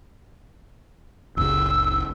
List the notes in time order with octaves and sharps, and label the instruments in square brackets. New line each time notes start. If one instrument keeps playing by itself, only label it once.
[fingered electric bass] F#1 C#2 C#3 [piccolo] E6